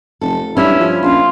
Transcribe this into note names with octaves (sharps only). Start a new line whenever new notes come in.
F1 A4
G2 C#4 E4
F3
A#1 F4